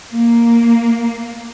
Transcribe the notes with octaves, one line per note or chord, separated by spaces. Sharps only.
A#3